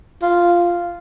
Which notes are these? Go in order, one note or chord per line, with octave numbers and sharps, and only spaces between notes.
F4